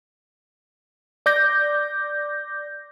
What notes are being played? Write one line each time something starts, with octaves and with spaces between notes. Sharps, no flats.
D5 D6 G6 A#6